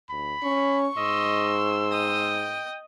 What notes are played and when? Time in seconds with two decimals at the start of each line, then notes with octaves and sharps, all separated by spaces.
0.10 D2 B5
0.43 C#4 C#6
0.97 G#2 D#5 C6 E6
1.92 D#5 G5 D#6